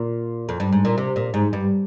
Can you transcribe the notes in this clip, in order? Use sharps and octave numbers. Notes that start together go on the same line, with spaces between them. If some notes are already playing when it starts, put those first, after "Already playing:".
Already playing: A#2
F2
G2
G#2
A#2
C3
A#2
G#2
G2